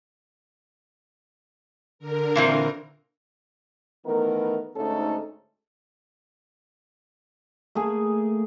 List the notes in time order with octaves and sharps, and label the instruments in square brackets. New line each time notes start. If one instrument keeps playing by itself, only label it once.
[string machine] D3 A#4
[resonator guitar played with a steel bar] A#2 E3 C4
[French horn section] D#3 E3 A3 B3 A#4
D2 G#2 A3 C#4 D#4 A4
[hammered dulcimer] A3 A#3 G#4